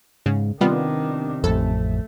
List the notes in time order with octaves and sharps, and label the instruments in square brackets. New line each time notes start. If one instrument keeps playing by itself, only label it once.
[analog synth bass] G#2 [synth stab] C#3
[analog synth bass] C3 [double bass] D#3 D4 [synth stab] G3 B3 F4
[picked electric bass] A1 F2 [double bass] A3 [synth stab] A4